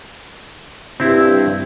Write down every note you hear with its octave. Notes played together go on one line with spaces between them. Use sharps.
G2 C4 E4